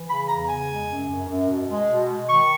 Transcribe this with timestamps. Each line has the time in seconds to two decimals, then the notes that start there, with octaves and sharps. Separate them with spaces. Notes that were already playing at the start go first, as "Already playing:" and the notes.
Already playing: E3
0.09 C#3 B5
0.29 E2 A#5
0.49 C#3 G#5
0.69 G#3
0.89 F#2
1.09 F#2
1.29 F#2
1.49 B2
1.69 G#3
1.89 B2
2.09 G#3
2.29 D#3 C#6